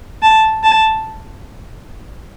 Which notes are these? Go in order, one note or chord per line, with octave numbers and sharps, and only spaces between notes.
A5
A5